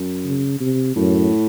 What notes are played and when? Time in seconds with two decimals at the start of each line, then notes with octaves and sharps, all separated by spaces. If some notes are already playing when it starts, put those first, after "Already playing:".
Already playing: F#2
0.25 C#3
0.60 C3
0.96 F#2 A2